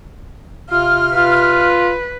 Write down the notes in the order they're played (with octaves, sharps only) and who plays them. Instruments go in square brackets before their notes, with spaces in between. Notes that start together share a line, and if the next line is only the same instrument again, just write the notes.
[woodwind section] C3 F5 F6 [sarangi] F4
[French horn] F4 [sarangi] B4